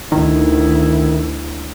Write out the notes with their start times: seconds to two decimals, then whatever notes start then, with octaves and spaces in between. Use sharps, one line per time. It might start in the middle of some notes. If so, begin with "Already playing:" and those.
0.12 D2 D#3 E4